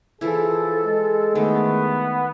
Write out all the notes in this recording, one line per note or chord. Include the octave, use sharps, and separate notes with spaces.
E3 F3 E4 G#4 A4
G#3
D#3 A3 B3